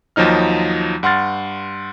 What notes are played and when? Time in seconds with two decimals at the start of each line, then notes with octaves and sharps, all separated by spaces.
0.16 D#2 F3 F#3 D#4 F6
1.03 G2 F#5 C6 F6 A6